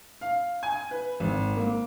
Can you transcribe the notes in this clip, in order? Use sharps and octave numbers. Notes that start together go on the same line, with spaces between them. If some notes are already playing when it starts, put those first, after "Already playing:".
F5
G#5
B4
G#1
A#3